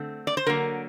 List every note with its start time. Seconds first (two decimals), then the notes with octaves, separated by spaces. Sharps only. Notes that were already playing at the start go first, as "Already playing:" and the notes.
Already playing: D3 A3 C4
0.27 D5
0.37 C5
0.46 D3 F#3 A#3 A#4